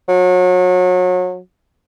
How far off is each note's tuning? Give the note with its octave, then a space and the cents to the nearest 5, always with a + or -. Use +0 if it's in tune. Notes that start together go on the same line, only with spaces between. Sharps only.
F#3 -30